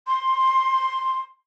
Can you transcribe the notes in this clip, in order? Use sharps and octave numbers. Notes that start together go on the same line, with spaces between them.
C6